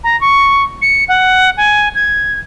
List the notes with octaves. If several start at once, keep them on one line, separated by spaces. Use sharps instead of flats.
A#5
C#6
C#7
F#5
G#5
G#6